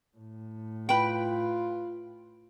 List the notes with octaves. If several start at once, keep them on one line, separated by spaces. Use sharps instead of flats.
A2
F4 B4 G5